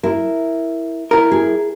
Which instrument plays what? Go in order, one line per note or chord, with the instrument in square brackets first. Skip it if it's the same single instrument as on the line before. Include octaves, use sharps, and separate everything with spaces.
[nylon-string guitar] E4 A#4
[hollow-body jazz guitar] E4 A#4
[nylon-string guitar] G#4